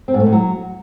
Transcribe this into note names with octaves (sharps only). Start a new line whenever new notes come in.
C4
G#2
A3
A2
F#3